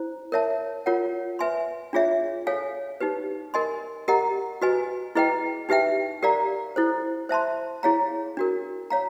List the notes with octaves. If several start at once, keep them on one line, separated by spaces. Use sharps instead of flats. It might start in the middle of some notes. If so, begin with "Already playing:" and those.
Already playing: E4 C5
A#4 C#5 E5 A5
F4 A#4 C#5 F#5
B4 E5 G#5 C6
D4 F4 G#4 C#5 E5
A4 C#5 F5 G#5
D#4 G4 B4
A#4 D#5 G#5 C6
G4 A#4 D#5 F#5 A#5
F#4 B4 D#5 G#5
E4 G#4 B4 D#5 G5
D#4 G4 B4 E5 G5
G4 A#4 D5 F5 A#5
E4 A4 C5
C5 E5 A5 C6
E4 G#4 C#5 F5 A#5
D4 F#4 A#4
C#5 F5 A#5